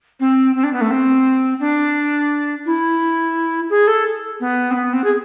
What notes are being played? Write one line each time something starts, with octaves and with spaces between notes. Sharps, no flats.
C4
C4
D4
B3
A3
C4
D4
E4
G#4
A4
B3
C4
B3
C4
G#4